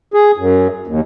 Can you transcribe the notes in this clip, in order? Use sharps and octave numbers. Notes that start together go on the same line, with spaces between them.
G#4
F#2
D#2